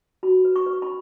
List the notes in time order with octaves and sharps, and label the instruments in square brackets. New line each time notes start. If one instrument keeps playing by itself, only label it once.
[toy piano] F#4 B5
B4
C#6
B4
B5